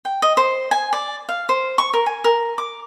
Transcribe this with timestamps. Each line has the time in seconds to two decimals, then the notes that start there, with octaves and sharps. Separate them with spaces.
0.05 G5
0.22 D#5
0.37 C5
0.71 G#5
0.93 D5
1.29 F5
1.49 C5
1.78 C#6
1.93 A#4
2.06 G#5
2.24 A#4
2.58 D6